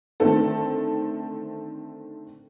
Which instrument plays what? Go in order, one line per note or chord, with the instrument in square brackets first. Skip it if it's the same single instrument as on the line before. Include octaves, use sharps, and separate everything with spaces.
[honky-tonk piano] D3 D#3 A3 C4 A4